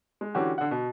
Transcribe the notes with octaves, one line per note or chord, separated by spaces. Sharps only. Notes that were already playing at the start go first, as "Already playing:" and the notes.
G#3
D3 E3 C#4 F#4 G4
D3 F#5
B2